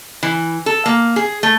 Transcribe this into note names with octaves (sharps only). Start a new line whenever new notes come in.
E3
A4
A#3
G#4
A3